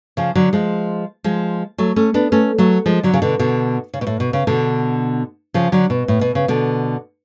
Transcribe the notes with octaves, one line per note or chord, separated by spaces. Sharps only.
C#3 F3
D3 F#3
F3 G#3
F3 G#3
F#3 A3
A3 C#4
B3 D4
A3 C#4
F#3 A3
F3 G#3
D3 F#3
C#3
B2 D3
B2 D3
C#3
B2
A2
B2
C#3
B2 D3
C#3 F3
D3 F#3
B2
A2
B2
C#3
B2 D3